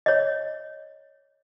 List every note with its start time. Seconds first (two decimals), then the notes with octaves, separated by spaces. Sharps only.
0.06 C#5 D#5